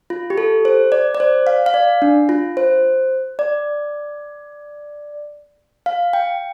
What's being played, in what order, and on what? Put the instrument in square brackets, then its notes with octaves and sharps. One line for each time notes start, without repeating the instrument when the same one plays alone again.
[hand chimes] F4
G4
A4
C5
D5
D5
C5
F5
F5
D5
D4
F4
C5
D5
F5
G5